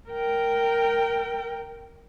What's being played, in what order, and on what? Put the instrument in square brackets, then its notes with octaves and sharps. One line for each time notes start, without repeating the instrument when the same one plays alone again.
[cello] A#4 G5